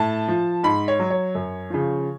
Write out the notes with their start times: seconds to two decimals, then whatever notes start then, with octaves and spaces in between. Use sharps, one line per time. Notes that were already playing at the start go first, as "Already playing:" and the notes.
Already playing: A2 A5
0.28 F3
0.63 G#2 B5
0.88 C#5
1.00 F#3
1.10 C#5
1.35 F#2
1.70 C#3 F3